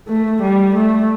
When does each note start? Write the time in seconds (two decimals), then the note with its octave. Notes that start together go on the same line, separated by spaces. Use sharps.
0.08 A3
0.42 G3
0.75 A3